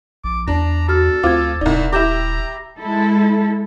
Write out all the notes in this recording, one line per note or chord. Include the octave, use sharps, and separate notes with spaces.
A#1 D6
E2 D4 A#5
F#4 A4 F6
D2 C4 F4 D6 G#6
D#1 C2 D#4 D5
E4 G4 A#5 D6 G6 E7
G#3 E4 A4